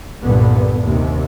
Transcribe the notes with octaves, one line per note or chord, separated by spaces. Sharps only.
C2 G2 A#2 D3 B3
D#2 C3